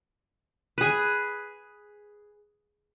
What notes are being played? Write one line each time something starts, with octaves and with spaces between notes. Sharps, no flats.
G#4 B4